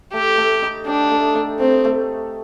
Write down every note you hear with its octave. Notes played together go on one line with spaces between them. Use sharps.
A3 G4
A3
D#4
D4 G4
A3
A3
A3 C4
A3